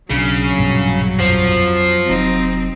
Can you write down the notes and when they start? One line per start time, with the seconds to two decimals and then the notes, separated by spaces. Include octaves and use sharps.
0.11 B1 C#3 F#3 D4
0.57 A#1 G2 B2
1.19 F2 F3
2.09 F1 F#3 C4 D#4